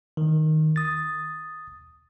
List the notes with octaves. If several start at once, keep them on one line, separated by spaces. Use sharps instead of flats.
D#3
D#6 A6